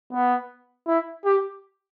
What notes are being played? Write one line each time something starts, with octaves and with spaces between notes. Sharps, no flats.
B3
E4
G4